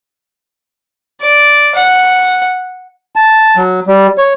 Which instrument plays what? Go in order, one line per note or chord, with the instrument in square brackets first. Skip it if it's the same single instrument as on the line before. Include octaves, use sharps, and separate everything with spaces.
[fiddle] D5
F#5
[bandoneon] A5
F#3
G3
C#5